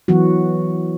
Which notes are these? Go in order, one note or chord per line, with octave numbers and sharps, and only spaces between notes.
E3 F#3 B3 F#4